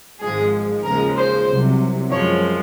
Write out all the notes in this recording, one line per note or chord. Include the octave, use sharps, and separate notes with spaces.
G#1 G#2 F3 G#3 G#4
D#2 C#3 F3 G#3 A#4
C5
C2 C3 F#3
F#2 F3 G#3 C#5